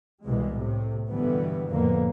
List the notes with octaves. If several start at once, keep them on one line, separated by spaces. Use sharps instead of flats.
C2 B2 E3 G3 G#3
A2 C3
G2 B2 D3 E3 G3 B3
F2 A2 D3 A#3 B3